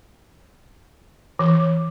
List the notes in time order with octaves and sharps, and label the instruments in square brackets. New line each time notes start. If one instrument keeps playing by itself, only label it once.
[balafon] E3